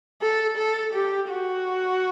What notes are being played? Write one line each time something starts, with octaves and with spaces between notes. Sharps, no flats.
A4
A4
G4
F#4